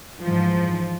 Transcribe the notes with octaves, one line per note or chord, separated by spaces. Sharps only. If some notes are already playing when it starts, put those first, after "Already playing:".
G#2 E3 F3